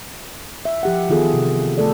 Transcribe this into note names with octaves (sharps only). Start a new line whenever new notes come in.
E5
F3 G4 F#5
D#3 E3 B3 F4 G#4 A4
C3
A3 A4 D5